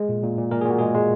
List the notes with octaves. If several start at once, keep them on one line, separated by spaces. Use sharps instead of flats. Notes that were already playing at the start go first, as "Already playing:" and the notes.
Already playing: G#3 G#4
A#2
A#2
A#2
A#2 A#4
G#4
A#2 F#4
G#3 G#4
G#3